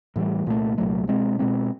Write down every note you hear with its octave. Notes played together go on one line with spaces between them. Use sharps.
A2 E3 G3
C2 A#2 F#3 A3
C2 A#2 F#3 A3
B2 G#3 C4
B2 G#3 C4